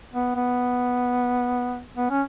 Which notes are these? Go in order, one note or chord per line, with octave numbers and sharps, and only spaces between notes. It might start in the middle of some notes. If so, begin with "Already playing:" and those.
B3
B3
B3
C#4